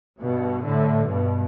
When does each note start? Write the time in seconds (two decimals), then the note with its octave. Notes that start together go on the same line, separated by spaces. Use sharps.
0.19 G2 B2
0.63 A2 D3
1.07 G2 B2